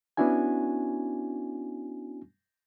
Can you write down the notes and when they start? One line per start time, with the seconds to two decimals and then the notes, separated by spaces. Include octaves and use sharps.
0.17 B3 C#4 D4 E4 F#4 G#5